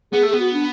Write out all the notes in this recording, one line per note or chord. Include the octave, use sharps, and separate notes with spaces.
B3 G#4
A3
B3 G#4
F#4
D4